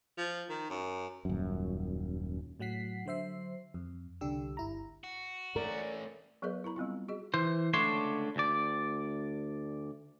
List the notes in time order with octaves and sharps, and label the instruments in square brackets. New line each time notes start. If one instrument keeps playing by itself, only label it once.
[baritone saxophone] F3
D#3
F#2
[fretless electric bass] D#1 F#2
[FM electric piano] A2 F#3 F#5 B6 C7
D3 F#3 C5 E5 C7
F2
C2 D3 D4 G4 E6
G1 E4 A#5
[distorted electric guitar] F#4
[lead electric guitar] A3 C#4 [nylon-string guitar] A#4 [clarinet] D5
[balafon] F#3 B3 G#4 A#4 B4 D#5
E4 A#4 A#5 B5
G3 B3 C4 F4
F#4 G#4 D#5
[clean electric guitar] E3 C5
C#2 D3 A3 D4 C#5 C6
D2 D5